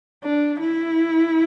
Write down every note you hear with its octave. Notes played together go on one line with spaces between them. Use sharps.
D4
E4